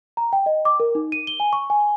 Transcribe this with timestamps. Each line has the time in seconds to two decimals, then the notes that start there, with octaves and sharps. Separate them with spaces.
0.17 A#5
0.33 G5
0.46 D#5
0.65 D6
0.80 A#4
0.95 D#4
1.12 D#7
1.27 G7
1.40 G#5
1.53 C#6
1.70 G#5